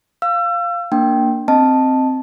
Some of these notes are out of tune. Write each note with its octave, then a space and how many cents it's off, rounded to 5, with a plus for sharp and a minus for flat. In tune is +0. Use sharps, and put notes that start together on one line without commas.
F5 +0 E6 +35
A#3 +0 D4 +0 G5 -15
C4 +0 D#5 +0 A5 +0